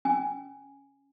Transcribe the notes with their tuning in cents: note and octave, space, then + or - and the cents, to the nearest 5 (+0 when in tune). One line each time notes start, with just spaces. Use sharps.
C#4 +0 G#5 +0